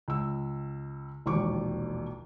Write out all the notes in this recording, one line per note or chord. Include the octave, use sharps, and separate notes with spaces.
C#2 E6
E1 A#1 D#2 C#6 D6